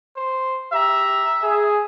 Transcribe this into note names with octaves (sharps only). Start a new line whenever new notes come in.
C5
G4 E5 A#5
G#4